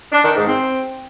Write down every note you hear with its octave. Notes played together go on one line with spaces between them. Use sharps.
D4
D#3
G#2
C4